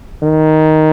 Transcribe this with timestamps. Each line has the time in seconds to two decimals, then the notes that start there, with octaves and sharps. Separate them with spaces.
0.23 D#3